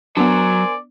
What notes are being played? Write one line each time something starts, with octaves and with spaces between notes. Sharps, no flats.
F#3 B3 D4 A#4 C5 D5 G#5